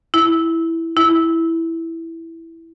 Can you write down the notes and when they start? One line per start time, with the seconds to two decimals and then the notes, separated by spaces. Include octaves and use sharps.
0.14 E4
0.97 E4